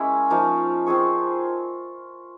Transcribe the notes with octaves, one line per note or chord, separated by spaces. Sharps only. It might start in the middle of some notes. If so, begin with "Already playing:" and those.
Already playing: G#3 A#3 C#4 E4 G#4
F3 A#3 D#4
C4 F4 G#4 C#5